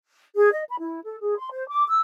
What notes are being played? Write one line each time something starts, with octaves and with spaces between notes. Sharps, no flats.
G#4
D#5
B5
E4
A4
G#4
C6
C5
D6
E6